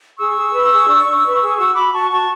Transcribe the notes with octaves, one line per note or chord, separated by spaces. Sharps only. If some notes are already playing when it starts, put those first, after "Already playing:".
G#4 C#6 E6
G#4
B4
G#4
D4
D4
B4
G#4
F#4 C#6 E6
F#4 B5 D6
F#4 A5 C#6
F#4 A5 C#6